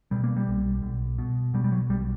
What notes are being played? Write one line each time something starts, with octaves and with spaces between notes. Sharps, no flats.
B2 G3
A#3
G3
B1
B1
B2
B2 G3
G3
F#3
B1 G3